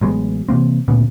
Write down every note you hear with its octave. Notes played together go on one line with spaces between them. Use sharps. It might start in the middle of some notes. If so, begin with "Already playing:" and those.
A1 F#3 G#3 B3
C3 E3 A#3 C4
D2 A#2 C#3 B3